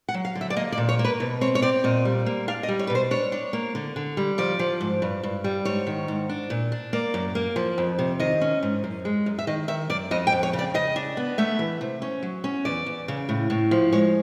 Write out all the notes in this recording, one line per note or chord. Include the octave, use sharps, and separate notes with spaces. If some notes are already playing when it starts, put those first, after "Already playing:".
F#5
F#3
F5
D3
E5
D5
A#3 D#5
D5
A#2
C#5
A#3
B4
B2
C4 C#5
C#5
C4 D5
A#2 D#5
G3
A#3
D4 F5
D#5
G3
C#5
B4
B2
C5
D4 C#5
D4
A#3
D3
D3
G3
F3 D5
F3
G#2
G2
G2
G3
G#2 C#5
D#3
G#2
D4
A#2
D4
A#3 D5
F#2
A#3
F3
F2
C3
D#3 D#5
C#4
G#2
F#2
G#3
F#2
E5
D#3 D#5
D#3 E5
F#2 D5
F2 D#5
G5
F2
C#5
C#3
D5
C#3 D#5
D4
B3
A3 E5
E3
C3
C#4
F#3
C#4
E2 D5
E2
C#3
A2
A2
F3
G#3 C#5